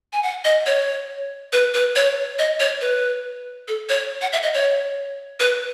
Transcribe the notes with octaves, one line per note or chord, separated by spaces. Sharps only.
G#5
F#5
D#5
C#5
B4
B4
C#5
D#5
C#5
B4
A4
C#5
F#5
E5
D#5
C#5
B4